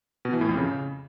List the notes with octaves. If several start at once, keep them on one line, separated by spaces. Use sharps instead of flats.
B2
E3
A2
F2
C#3